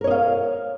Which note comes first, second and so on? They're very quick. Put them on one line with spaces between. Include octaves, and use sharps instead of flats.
A#4 C#5 D#5 F5